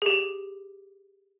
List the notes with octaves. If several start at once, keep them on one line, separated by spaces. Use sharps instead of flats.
G4 G#4